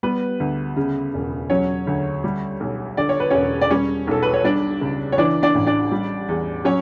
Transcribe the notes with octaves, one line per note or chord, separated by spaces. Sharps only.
G3 B3 B4
D2
C#3
E1
F#3 C#4 C#5
D2
G3
B1
D3 D5
C#5
B4
E1 C#4 C#5
D5
G3 C#4 C#5
B1 A4
B4
C#5
G3 D4 D5
C#2
C#5
E3 D4 D5
D4 D5
A1
D4 D5
G3
E2
F#3 C#4 C#5